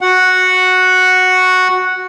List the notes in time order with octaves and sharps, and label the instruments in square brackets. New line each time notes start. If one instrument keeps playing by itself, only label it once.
[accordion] F#4 F#5